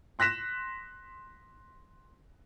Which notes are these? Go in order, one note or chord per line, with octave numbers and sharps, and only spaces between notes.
C6 F#6 A#6 B6 E7